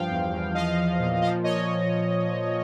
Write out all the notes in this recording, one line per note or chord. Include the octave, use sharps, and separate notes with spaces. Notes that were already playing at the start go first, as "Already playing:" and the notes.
Already playing: G2 F3 F5 G5
E2
E2
F3 D#5 F5
F3
A#2
F3 D#5 F5
A#2 C#5 D#5